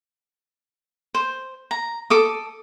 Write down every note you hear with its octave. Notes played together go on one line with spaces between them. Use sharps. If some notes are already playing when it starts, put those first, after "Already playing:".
C5
A#5
A4 D6 D#6